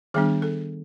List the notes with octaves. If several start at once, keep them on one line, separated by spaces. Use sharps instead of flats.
D#3 G3 B3 D4 G#4
A4